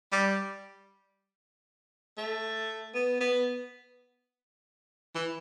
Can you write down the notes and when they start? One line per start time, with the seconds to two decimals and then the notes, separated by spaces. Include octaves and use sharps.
0.12 G3
2.17 A3
2.94 B3
3.20 B3
5.15 E3